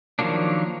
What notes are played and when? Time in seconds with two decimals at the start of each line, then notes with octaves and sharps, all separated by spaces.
0.19 D#3 F3 F#3 A#3 D4